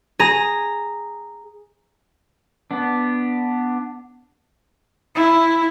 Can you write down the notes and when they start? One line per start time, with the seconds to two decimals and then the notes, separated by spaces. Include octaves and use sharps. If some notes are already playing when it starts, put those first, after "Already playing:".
0.19 G#4 A#5
2.71 B3 D4
5.16 E4